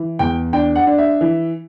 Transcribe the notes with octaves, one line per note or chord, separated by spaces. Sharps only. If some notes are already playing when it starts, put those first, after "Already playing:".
Already playing: E3
E2 G5
D4 G5
F#5
D4
E5
E3